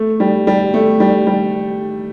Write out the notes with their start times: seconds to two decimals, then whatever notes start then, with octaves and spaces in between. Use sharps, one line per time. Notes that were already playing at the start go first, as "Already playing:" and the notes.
Already playing: A3
0.20 G3
0.47 G3
0.74 A3
1.00 G3
1.27 G3